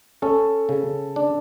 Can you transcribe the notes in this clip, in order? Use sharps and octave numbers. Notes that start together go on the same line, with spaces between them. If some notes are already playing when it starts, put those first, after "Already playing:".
C#4 A4
C#3
D4